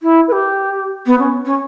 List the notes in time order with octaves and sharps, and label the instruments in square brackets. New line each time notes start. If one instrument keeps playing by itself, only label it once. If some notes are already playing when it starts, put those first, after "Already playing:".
[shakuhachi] E4
B4
G4
B3
C#4
C#4